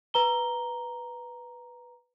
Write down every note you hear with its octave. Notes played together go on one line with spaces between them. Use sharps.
B4 A#5 G7